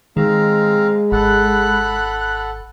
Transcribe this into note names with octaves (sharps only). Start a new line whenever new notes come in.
D#3 G#3 C4 F5 A#5
G#1 A4 F#5 B5 F#6